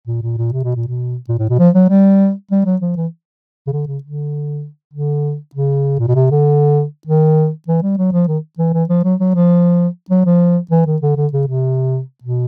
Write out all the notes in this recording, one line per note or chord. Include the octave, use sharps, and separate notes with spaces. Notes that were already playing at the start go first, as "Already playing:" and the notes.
A#2
A#2
A#2
C3
B2
A#2
B2
A#2
A2
B2
F3
F#3
G3
G3
F#3
F3
E3
C#3
D3
C#3
D3
D3
C#3
A#2
B2
C3
D3
D#3
E3
G3
F#3
F3
D#3
E3
E3
F3
F#3
F#3
F3
F#3
F3
E3
D#3
D3
D3
C#3
C3
B2